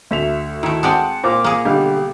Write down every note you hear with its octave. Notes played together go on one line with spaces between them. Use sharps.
D2 E5 F7
D#3 A3 E4
G#3 C4 D5 F#5 A5 D#6
A#2 F4 A#4 C5 D6
A#3 G#4 F5
B1 D3 G3 F5